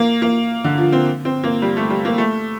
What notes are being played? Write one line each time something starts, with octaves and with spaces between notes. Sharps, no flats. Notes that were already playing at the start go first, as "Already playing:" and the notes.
Already playing: A#3
A#3
D3
F3
C4
C4
A#3
G3
A3
G3
A#3
A3